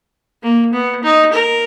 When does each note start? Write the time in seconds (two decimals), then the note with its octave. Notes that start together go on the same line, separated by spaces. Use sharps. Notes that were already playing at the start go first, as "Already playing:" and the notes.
0.43 A#3
0.73 B3
1.03 D#4
1.32 A#4